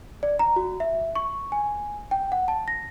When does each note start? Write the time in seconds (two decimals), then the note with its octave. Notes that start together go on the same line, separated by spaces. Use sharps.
0.23 D5
0.39 A#5
0.56 F#4
0.80 E5
1.16 C#6
1.52 G#5
2.11 G5
2.32 F#5
2.48 A5
2.68 A#6